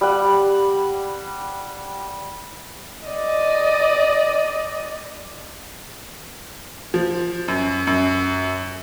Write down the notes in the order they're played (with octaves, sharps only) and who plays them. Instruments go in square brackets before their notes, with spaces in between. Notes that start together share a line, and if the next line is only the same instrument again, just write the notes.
[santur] G3 F#5
[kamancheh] D5 D#5
[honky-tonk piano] F3
F#2
F#2